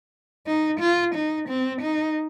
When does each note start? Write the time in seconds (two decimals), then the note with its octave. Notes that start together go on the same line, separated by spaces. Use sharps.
0.47 D#4
0.80 F4
1.15 D#4
1.48 C4
1.81 D#4